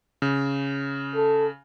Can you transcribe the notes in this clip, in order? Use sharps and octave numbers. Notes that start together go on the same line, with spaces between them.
C#3
A4